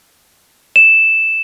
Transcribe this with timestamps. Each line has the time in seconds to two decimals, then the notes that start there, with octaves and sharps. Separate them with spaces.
0.76 E7